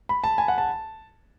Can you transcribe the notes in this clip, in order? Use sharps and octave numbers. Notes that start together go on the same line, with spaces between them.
B5
A5
G#5
F#5
A5